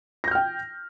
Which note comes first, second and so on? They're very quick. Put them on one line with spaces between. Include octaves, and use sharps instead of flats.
A#6 G6 F6 G5